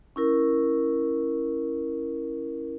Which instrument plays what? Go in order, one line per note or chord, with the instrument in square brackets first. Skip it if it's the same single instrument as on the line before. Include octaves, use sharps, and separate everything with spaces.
[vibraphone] C#4 E4 A#4